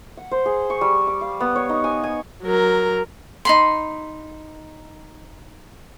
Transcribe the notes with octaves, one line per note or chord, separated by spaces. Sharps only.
F#5
C5
G#4
C#6
G3
D6
F5
B3
C#5
D#4
G#5
G#5
F#3 A#4
D#4 B5 C6